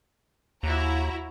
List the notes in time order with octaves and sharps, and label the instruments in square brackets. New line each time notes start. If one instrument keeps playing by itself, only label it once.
[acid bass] D#2 [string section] E4 F#4 A#5